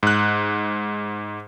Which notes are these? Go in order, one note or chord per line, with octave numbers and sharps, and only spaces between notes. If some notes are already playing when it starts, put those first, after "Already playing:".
G#2 F#6